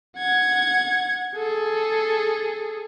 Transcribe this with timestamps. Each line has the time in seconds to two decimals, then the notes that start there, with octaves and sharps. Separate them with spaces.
0.17 F#5 G#6
1.36 G#4 A4